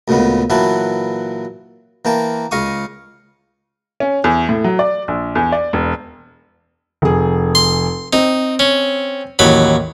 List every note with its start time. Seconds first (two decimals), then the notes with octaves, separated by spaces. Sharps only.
0.08 D2 A#2 C#3 G#3 B3
0.50 A#2 E3 F#3 E4 B4 A5
2.05 E3 A#3 G5 A5
2.51 C#2 D#5 F5 C#6 D#6
4.00 C#4
4.24 E2
4.49 A2
4.64 F#3
4.79 D5
5.08 A#1
5.35 E2
5.52 D5
5.73 E1
7.02 F1 G#4
7.55 C6
8.13 C4 D#4
8.59 C#4
9.39 A1 D#2 F#3 B5